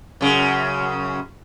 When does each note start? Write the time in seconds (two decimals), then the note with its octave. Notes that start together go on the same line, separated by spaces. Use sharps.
0.21 F#2 C#3